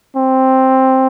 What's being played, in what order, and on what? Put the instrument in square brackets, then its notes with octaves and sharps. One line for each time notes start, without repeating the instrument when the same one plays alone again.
[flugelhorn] C4